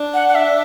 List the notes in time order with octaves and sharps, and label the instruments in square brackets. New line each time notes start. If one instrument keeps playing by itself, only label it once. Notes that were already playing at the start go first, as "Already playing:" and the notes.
Already playing: [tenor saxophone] D4
[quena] F#5
F#5
E5